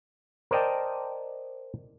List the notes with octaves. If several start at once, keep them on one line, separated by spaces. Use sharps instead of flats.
A#4 C5 D5 D#5 G5 A5